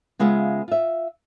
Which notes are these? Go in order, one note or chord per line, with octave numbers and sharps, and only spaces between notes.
C#3 G#3 B3 F4 E5
F4 E5